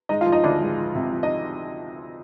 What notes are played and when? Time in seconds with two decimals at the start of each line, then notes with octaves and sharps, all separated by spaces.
0.09 G#3 D#4 D#5
0.21 F4 F5
0.26 F3
0.32 D#4 D#5
0.43 D2 D4 D5
0.61 G#3
0.78 F3
0.95 C3
1.12 F3
1.23 D#4 D#5